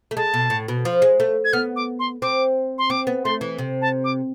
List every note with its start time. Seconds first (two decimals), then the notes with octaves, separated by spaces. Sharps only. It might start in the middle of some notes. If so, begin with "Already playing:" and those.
0.11 A3
0.16 G#3 A5
0.34 B2
0.50 A2
0.68 B2
0.85 F3
1.02 G#3
1.20 A3
1.45 G#6
1.53 B3 F6
1.76 D6
1.99 C6
2.22 C4 D6
2.78 C6
2.90 C4 D6
3.07 B3
3.25 A3 C6
3.41 E3
3.59 C3
3.81 A5
4.04 D6